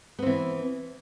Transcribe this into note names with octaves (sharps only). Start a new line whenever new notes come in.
E3 B3 C4